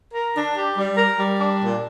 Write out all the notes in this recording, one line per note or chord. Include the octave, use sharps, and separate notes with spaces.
A#4
D4
G4
G3
A#4
G3
D4
A#2